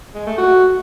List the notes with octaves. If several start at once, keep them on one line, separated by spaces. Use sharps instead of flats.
G#3
A3
F#4